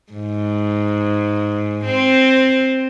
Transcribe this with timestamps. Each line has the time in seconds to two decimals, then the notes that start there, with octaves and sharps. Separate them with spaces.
0.13 G#2
1.85 C4